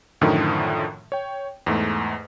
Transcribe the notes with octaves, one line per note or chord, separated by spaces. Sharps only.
F#2 A2 D3 D#3 F3
C#5 G5
E2 G#2 A3